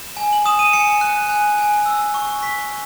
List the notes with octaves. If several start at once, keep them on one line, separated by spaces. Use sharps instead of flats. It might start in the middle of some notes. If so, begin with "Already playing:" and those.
Already playing: E7
G#5
F#7
D#6 E7
D#7
G#5 C#7
F#6
G#5
G#5
E6
C#6
C#6 B6